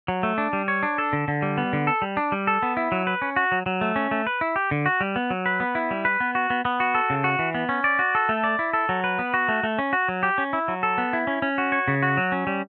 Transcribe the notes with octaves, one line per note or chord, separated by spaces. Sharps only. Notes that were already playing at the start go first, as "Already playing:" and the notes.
F#3
A3
D4
G3
C#5
D4
A4
D3
D3
G3
B3
D3
A4
G3
D4
G3
A4
B3
E4
F#3
B4
C#4
F#4
F#3
F#3
A3
C#4
A3
B4
E4
G4
D3
F#4
G3
B3
F#3
B4
B3
E4
G3
B4
B3
F#4
B3
B3
F#4
A4
C#3
F#4
E3
B3
C#4
D5
F#4
A4
A3
D5
E4
A4
F#3
B4
B3
F#4
A3
A3
C#4
F#4
F#3
G4
C#4
E4
F#3
A4
B3
E4
C#4
C#4
F#4
C#5
C#3
F#4
F#3
C#4
G3